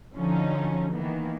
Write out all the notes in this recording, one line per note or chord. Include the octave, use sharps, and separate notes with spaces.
D3 F3 F#3 C#4 D#4
D#3 E3 A#3 B3